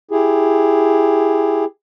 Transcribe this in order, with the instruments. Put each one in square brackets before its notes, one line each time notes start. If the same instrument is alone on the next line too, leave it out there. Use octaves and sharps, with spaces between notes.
[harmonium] E4 G4 G#4